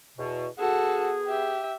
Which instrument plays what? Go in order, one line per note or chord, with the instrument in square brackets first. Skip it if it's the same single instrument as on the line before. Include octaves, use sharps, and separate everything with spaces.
[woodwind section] E2 B2
[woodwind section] B3 G#4 [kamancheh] F#4 A4
[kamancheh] G4 E5